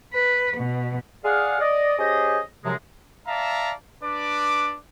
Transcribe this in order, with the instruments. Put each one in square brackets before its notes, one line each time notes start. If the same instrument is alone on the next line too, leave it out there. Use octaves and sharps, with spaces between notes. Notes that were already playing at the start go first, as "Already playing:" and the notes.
[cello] B4
B2
[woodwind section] G#4 D5 F5 F#5
D5 D#5
C#4 G4 G#4 C5 D#5
F#2 C3 F3 F#3 G#3
[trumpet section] D5 E5 F5 A5 A#5
D4 B4 D5 D6